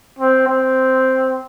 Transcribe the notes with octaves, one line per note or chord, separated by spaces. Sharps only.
C4
C4